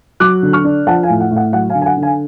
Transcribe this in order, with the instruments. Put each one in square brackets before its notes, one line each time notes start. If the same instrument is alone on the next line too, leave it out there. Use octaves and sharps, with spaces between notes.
[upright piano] F#3 D6 F#6
D3
C#6 F6
D4
F3 F#5 A5
F5 G#5
A2
F#5
A2
F#5
F#3 F#5
F5 G#5
D3
G#5
F#5
D3
F5 G#5